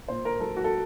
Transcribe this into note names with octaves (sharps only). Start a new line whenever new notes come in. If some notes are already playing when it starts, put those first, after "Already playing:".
A#2 C5
A#4
F#3 A4
F#4
A4